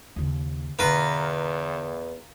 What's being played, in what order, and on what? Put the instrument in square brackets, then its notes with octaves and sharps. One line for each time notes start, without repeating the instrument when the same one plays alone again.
[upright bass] D#2 C#3
[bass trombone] E2 [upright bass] B2 D3 [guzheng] F4 A#4 [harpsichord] B4